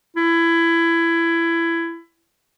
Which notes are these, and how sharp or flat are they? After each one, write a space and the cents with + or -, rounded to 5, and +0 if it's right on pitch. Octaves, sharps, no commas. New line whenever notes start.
E4 +20